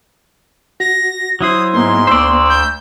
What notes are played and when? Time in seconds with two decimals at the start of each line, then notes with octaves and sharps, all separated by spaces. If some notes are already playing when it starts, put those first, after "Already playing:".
0.80 F#4 A#6
1.41 F#3 E4 C5 D#6
1.74 G#2 A#3 B3 C6
2.07 D2 C5 D5 E6
2.50 G6